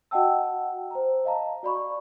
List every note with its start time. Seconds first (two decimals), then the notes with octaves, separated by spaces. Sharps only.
0.11 F#4 D#5 F#5 G5 A5 E6
0.91 C5 A#5
1.25 D#5 F5 A5 A#5
1.63 F#4 D5 B5 C#6